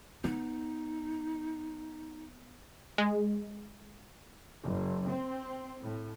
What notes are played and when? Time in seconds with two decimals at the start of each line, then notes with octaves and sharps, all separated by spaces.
0.24 B3 D#4
2.98 G#3
4.63 F#1
5.08 C4
5.82 A2